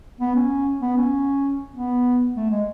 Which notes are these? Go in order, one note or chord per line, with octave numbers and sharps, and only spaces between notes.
B3
C#4
B3
C#4
B3
A3
G#3